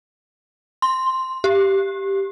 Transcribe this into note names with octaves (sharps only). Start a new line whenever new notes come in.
C6
G4